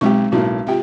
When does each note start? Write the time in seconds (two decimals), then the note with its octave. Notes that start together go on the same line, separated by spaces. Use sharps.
0.01 B1 G#3 C4 G4 C#6
0.32 B1 A2 A#3 F#4
0.67 C3 F4 G4 E5 G5